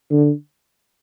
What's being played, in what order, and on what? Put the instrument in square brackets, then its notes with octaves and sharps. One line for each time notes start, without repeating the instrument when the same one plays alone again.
[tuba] D3